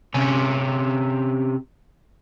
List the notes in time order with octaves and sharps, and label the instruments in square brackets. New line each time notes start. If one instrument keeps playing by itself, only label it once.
[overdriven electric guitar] C3 C#4